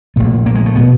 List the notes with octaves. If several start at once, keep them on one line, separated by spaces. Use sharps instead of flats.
A#1 A#2 A3
A#3
G#3
A3
B2 B3